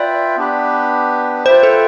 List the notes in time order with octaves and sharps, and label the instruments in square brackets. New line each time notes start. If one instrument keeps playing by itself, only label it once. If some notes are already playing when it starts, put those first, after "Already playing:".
Already playing: [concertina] F4 B4 E5 G5 [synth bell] D5
[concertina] B3 D4 G4 B4
[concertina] F4 B4 E5 G5 [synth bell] C5
[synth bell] A4